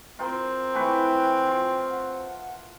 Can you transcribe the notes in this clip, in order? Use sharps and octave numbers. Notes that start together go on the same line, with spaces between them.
C4 F4 A#4 G5
E3 A3 B4 G5
F4
F#5